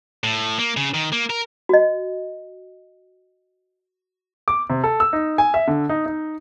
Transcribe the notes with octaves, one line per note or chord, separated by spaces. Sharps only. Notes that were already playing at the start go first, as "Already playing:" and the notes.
A2
A#3
C#3
D#3
A#3
A#4
F#4 D#5
D6
C3
A4
E6
D#4
G#5
E5
D3
D#4
D#4